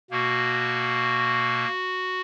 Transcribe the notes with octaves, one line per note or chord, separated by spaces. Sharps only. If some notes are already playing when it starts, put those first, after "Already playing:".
B2 A#3 F#4